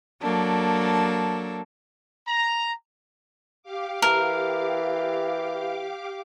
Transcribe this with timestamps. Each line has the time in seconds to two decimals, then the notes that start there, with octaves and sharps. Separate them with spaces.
0.22 F#3 A#3 D4 A4
2.27 A#5
3.63 G4 F5 D6
4.02 E3 A#4